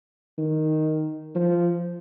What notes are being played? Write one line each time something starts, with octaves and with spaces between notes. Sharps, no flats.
D#3
F3